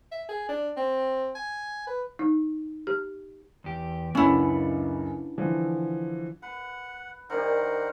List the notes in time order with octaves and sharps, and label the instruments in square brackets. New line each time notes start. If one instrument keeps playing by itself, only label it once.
[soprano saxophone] E5
G#4
D4
C4
G#5
B4
[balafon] D#4
G4
[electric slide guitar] E2 G4
[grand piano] F#1 C#2 F#2 [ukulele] C#4 E4 [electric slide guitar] D4 B4 F#5
[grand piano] D3 E3 F3
[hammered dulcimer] B4 [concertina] F#5
[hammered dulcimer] D#3 D4 G4 [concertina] A#4 C5 F#5